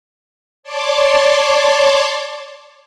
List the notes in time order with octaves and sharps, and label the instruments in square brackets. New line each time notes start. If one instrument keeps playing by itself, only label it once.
[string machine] C#5 D5 A5 C6 D6